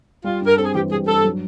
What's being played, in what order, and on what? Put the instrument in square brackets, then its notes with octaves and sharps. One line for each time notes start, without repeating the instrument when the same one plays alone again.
[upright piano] G3 [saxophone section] F4
[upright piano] G2
[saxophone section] A#4
[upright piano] C4 [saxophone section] A4
[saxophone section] G#4
[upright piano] E3 [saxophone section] G4
[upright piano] G3 [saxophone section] G#4
[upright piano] G2 [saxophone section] A4
[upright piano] F#3